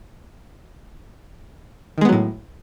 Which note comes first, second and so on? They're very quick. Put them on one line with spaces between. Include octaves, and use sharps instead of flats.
D#3 G#3 B3 F#3 A2